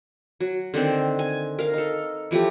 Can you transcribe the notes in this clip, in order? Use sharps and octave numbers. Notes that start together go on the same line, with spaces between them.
F#3
D3 D#3 C4 C5
G#5
A#4 F5
D#4 A4
E3 F3 A3 G4